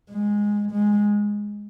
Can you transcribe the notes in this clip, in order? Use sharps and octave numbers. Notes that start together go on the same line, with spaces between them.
G#3
G#3